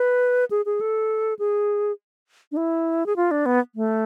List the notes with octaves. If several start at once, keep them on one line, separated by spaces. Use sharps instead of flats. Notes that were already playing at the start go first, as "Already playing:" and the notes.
Already playing: B4
G#4
G#4
A4
G#4
D4
E4
G#4
F4
D4
B3
A3